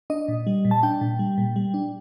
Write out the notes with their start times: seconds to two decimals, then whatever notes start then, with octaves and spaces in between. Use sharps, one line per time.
0.10 D4 D#5
0.28 A#2
0.47 G3
0.65 A#2
0.71 A5
0.83 D4 G5
1.01 A#2
1.19 G3
1.38 A#2
1.56 G3
1.74 D4